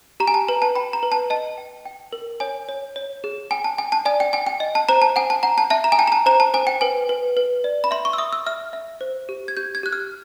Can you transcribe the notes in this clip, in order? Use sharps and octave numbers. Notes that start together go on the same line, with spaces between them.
G4 A#5
G#5
A5
B4 A#5
A5
G5 B5
A#5
B4
A5
D#5 A5
G5
G5
A#4
C#5 G#5
C#5
C#5
G#4
G5 G#5
A5
G5 G#5
A5
D5 G#5
G5
G5 G#5
G5
D#5
A5
C5 A#5
A5
F#5 G#5
A5
F#5 A#5
A5
E5 A5
A#5
G#5
G5 A5
A#5
A5
C5 A#5
A5
C5 G#5
G5
B4 G#5
B4
B4
D5
B5
E5 C6
C#6
E6
E5 D#6
E6
E5 F6
E5
C5
G4
G#6
G4 G6
G#6
G4 F#6
F6